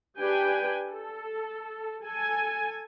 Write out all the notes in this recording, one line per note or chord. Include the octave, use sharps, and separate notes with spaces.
D4 G4 B4 G5 G#5
A4
A4 G#5